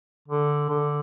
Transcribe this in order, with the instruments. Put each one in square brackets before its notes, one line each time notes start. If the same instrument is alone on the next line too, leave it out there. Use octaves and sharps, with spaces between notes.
[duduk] D3
D3